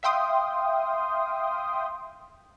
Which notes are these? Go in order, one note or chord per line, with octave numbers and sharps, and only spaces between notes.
E5 F5 G5 C6 D#6